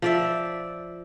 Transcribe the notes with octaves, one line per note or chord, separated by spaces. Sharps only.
F3 D5 E5